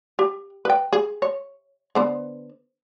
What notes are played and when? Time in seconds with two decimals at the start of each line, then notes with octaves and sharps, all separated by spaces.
0.19 G4
0.65 B4 G5
0.93 G#4
1.22 C#5
1.95 D3 B3 C5